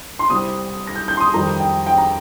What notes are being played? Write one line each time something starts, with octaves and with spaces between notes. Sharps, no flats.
C6
C2 C3 G3 C4 D#6
A#6
G6
G6
C6
D#6
F2 D#3 G3 C4 A#5
G5
G5
A#5